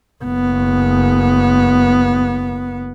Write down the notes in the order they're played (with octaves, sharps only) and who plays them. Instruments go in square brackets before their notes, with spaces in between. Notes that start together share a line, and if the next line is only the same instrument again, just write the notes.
[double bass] F#1 B3